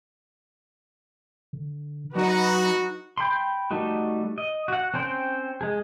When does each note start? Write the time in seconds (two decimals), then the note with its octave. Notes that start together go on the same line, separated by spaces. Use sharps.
1.53 D3
2.15 F#3 D#4 F#4 B4
3.18 G5 B5 C6
3.71 G3 A3 D#4 F#4
4.38 D#5
4.68 F#4 F#5
4.94 C4 C#4 C5 G5
5.61 G#3 G#4